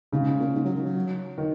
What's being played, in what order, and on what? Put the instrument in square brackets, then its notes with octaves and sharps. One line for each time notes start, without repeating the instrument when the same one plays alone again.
[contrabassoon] G#2 [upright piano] C#3
[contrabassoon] G#2
A#2
G#2
F#3
D#3
F#3
[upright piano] D#3